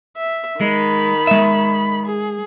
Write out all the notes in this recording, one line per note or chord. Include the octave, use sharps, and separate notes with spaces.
E5
D#3 G#3 B5
G#3 E5
G#4